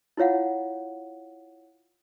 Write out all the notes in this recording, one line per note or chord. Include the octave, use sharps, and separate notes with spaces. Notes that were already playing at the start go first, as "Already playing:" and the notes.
E4 F4 C#5 F5 F#5